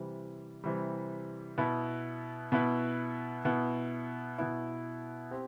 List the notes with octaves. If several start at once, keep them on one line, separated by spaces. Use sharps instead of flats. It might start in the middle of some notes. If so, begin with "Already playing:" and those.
Already playing: C3 E3 G3
C3 E3 G3
B2 B3 E4 B4
B2 B3 E4 B4
B2 B3 E4
B2 B3 E4
C4 G4